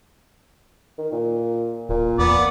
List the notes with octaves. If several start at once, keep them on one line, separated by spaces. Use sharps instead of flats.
D#3
A#2
D1 A#2
E2 B3 D5